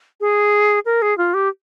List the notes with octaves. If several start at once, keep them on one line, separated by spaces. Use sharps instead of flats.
G#4
A#4
G#4
F4
G4